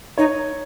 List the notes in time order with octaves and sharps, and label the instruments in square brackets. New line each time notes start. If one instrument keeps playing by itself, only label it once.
[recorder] D#4 [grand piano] C#5